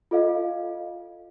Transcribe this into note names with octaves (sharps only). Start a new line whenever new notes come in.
F4 A4 D#5 F5